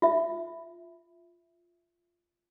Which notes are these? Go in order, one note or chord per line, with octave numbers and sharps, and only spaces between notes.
F4 E5